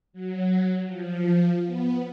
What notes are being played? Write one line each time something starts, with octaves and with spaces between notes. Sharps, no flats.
F#3
F3
B3